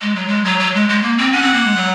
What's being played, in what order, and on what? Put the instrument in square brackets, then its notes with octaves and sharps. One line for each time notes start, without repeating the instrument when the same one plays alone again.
[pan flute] G#3
F#3
G#3
F#3
F#3
G#3
G#3
A#3
C4
[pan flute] C#4 [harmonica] F#5
[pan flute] C4
A#3
G#3
F#3